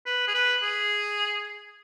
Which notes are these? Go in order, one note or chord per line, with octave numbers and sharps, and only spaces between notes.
B4
G#4
B4
G#4